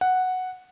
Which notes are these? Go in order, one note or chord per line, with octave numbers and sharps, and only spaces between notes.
F#5